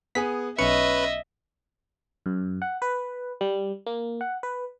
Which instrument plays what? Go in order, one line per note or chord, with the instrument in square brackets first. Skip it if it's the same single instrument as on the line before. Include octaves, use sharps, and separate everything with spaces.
[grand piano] B3 G#4 G#5 [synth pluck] B6
[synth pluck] B1 C#7 [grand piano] C#4 [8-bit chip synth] B4 [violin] D#5 E5
[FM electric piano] F#2
F#5
B4
G3
A#3
F#5
B4